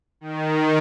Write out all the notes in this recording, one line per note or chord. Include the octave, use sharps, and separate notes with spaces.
D#3